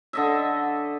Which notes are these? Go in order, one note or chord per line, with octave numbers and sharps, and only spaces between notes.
D3 D#5 E5